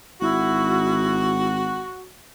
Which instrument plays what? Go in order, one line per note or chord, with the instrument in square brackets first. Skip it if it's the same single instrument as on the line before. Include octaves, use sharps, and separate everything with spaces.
[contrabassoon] G#1 [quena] E4 [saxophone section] F#4